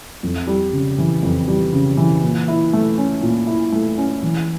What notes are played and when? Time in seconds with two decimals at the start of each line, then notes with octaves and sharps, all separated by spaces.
0.23 F2
0.47 G3
0.73 C#3
0.98 E3
1.23 F2
1.48 G3
1.73 C#3
1.97 E3
2.23 A#2
2.48 E4
2.73 A3
2.98 C#4
3.23 A#2
3.47 E4
3.72 A3
3.98 C#4
4.23 E3